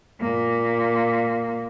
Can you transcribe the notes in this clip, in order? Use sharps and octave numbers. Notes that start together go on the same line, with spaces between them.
A#2 A#3